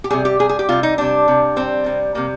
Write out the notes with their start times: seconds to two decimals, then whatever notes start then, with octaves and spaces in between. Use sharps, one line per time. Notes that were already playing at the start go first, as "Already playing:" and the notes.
0.04 G4
0.10 C3 G3 G#4
0.25 G4
0.39 C3 G3 G#4
0.49 G#4
0.59 G4
0.69 C3 G3 F4
0.83 D#4
0.98 C3 G3 D4
1.28 C3 G3
1.56 C3 G3 C4
1.86 C3 G3
2.15 C3 G3 A#3